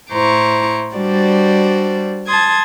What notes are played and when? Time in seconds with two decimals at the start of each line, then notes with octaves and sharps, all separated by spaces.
0.11 A2 E4 C5 A#5 C#6 D6
0.93 G3 D4 F#4 C5 D5
2.27 A5 C6 D#6 G#6